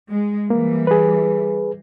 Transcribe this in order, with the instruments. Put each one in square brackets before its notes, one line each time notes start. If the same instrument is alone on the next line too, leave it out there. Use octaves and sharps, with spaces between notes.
[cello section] G#3
[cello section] E3 G3 [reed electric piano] A#3
[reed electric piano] G#4 B4